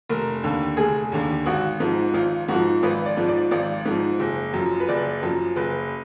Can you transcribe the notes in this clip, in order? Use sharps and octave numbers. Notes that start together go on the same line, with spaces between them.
F1 A#4
D#2 D3
F1 G#4
D#2 D3
G#1 F#4
G#2 F3
G#1 F4
G#2 F3 F#4
G#1 B4
D5
G#2 F3
D5
G#1 D5
G#2 F3
F#1
F#2 F3
B4
F#1 D5
F#2 F3
F#1 B4